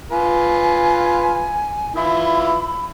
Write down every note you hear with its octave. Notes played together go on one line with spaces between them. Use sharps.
F4 B4 G#5
E3 E4 F4 B5